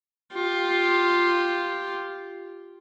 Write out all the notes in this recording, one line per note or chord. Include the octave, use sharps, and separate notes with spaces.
F4 G4